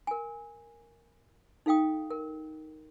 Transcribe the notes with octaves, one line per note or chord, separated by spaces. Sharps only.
A#4 G#5
D#4 A4 F5 G5 D#6
A#4